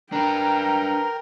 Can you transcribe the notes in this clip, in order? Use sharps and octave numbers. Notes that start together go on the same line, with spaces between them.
D4 A#4 B4 G5 A#5